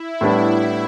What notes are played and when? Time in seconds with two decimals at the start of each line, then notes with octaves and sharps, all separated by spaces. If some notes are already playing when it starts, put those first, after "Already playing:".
Already playing: E4
0.21 A2 G3 B3 D4